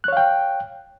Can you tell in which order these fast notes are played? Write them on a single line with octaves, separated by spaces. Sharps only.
F#6 C#5 F5 G5